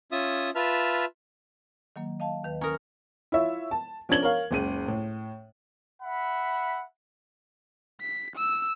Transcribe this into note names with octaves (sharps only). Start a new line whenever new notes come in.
C#4 F4 E5 D#6
F4 B4 E5 A5 F6
D#3 F#3 A#3
D#5 F5 A5
D#2 D#3 B4
C#4 A#4 A#5 D#6 F6
E4 F4 C#5 E5
A5
F3 C#4 D4 G#6 F#7 G7
A#4 C#5 F5
F#1 C#2 D#7
A2
E5 F#5 B5
B6
E6